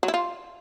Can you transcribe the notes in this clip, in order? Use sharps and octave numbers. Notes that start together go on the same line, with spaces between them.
F#3
E4
F4